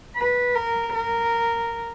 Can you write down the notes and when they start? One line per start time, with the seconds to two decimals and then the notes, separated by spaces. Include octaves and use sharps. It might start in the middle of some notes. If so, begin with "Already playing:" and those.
0.16 B4
0.55 A#4
0.95 A#4